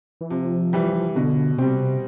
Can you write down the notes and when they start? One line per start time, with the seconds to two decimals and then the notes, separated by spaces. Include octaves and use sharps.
0.21 E3
0.30 C3 F3
0.73 E3 G3
1.15 B2 D3
1.58 C3 G3 C4